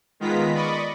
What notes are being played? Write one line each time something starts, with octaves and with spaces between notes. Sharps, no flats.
D#3 G#3 B3 F4 A#5 B6
D5 D#5 B5 C#6